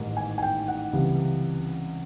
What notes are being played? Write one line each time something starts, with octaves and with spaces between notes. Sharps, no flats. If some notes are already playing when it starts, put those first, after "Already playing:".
Already playing: A1 G#2 D#3 G3 A#3
G#5
G#5
G5
F#5
C#2 C3 E3 G3